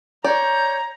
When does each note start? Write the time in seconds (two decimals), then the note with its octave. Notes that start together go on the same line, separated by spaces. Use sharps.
0.24 C#5 D5 A#5 G6